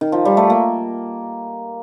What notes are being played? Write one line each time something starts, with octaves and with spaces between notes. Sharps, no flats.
D#3
F3
G3
A3
A#3